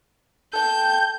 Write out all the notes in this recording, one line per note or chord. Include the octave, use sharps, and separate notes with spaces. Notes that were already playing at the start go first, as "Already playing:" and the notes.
A4 G5 G6